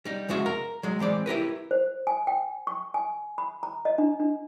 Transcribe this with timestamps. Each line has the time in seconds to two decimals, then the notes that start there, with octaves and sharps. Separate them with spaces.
0.05 G3 D#4
0.29 F2 C#3 G#3 F#4 E5
0.46 A#4
0.83 F#3 G#3
0.99 E3 G#3 C4 D5
1.26 E4 G4 A#4 B4
1.71 C5
2.07 G#5
2.27 G5
2.67 C#6
2.94 G#5
3.38 B5
3.63 A#5
3.85 D#5
3.98 D4
4.20 D4